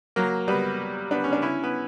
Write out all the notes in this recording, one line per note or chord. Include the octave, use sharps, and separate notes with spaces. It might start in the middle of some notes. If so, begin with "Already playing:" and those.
F#3 A#3
G3 B3
B3 D4
C#4
D4
C#4 E4
B3